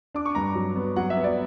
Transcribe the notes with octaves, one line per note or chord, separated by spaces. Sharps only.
D4 D6
C#6
G2 A#5
F#3
B3
F#3 F#5
E5
B3
D5